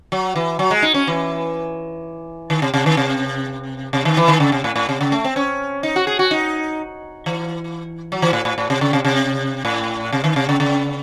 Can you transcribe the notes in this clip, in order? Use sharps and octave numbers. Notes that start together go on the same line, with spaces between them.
F#3
E3
F#3
G#3
D#4
C#4
E3
D#3
C3
C3
D#3
C3
C3
D#3
E3
D#3
C#3
C3
A2
A2
C3
C#3
A3
C4
C#4
D#4
F#4
G#4
F#4
D#4
E3
F#3
E3
A2
A2
A2
C3
C#3
C3
C3
A2
C3
D#3
C3
C#3
C#3